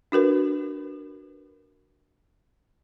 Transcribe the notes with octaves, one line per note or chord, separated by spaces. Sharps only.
D4 F#4 A#4 B4